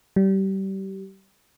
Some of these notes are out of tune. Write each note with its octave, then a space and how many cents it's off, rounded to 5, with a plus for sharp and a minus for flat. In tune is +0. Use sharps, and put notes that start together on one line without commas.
G3 -25